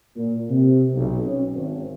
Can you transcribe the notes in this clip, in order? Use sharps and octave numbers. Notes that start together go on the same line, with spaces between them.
A#2
C3
B1
C#4
G#1